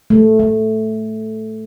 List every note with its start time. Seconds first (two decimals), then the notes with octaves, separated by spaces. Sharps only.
0.10 A3
0.39 A3